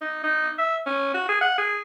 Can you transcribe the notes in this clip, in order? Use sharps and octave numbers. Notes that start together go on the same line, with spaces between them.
D#4
D#4
E5
C#4
F#4
G#4
F#5
G#4